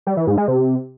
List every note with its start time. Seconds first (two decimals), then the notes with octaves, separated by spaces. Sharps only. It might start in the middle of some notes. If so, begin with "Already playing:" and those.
0.07 G3
0.17 E3
0.27 G#2
0.38 G#3
0.48 C3